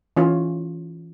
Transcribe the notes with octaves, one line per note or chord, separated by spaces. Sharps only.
E3 C#4 F4